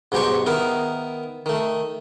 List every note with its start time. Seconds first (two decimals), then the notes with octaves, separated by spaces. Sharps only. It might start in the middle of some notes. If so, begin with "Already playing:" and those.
0.12 G#2 B2 F#3 G4 C5 C#6
0.46 D#3 B3 E4 A#4
1.46 D#3 A3